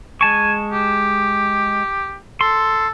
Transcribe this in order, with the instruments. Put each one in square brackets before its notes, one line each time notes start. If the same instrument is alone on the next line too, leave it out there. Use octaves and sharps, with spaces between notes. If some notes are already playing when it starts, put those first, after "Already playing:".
[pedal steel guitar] G#3 A5 C#6 [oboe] G#5
[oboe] G4
[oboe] A4 [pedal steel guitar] C6